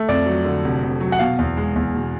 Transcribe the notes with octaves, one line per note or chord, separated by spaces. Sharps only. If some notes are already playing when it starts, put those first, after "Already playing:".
Already playing: A3
F2 D5
F#3
D3
F1
F2
F#3
F#5
B2 F5
E2
G#3
E2
B2